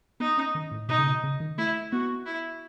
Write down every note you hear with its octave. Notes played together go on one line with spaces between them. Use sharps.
B3 D#4
C#4
D#3
A2
B2 D#4
C#3
B2
C#3
D#3
A3 E4
B3 F#4
E4